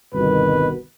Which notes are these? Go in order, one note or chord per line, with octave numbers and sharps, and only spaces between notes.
G1 C2 B2 D#3 B4